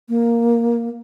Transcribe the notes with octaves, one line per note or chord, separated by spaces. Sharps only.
A#3